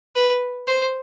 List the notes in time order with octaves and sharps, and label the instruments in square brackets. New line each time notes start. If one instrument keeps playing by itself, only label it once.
[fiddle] B4
C5